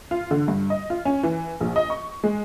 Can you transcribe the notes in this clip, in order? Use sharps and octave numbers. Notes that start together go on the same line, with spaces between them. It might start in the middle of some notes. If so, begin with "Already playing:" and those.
F4
D3
G2
D#5
F4
C#4
E3
A#1
D#5
C#6
G#3